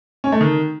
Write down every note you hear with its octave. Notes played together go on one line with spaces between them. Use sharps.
C#4
A3
D#3